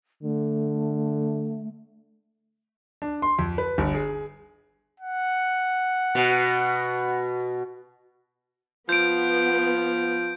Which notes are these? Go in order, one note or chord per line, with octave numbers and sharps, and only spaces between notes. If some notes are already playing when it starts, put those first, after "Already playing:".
D3 A3
D4
C6
F2
B4
G1
G#4
F#5
B2
F3 B3 G6 D7